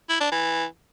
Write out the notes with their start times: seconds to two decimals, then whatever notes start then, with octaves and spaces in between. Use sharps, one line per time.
0.09 E4
0.20 D4
0.32 E3